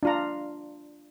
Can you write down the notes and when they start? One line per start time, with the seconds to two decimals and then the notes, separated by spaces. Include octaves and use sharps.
0.03 D4 F4 A#5